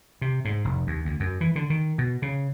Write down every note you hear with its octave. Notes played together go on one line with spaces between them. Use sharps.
C3
G#2
F1
D#2
D2
F#2
E3
D3
D#3
B2
C#3